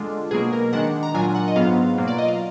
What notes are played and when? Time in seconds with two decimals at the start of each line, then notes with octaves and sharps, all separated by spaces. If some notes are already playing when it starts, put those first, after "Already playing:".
Already playing: D3 G#3 D4 F4
0.31 B2 F#3 A#3 G#4
0.53 A#4
0.73 D#3 G#3 D4 F#5
1.03 A#5
1.14 A#2 F#3 D4 F4 G#5
1.35 F#5
1.48 D#5
1.56 G#2 F#3 B3 F4 F5
1.98 B2 F#3 A#3 F4
2.08 D5
2.18 D#5
2.28 F5